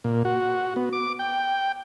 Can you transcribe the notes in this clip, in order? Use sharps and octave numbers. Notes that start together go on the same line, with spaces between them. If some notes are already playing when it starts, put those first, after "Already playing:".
A#2
F#4
B3
D6
G5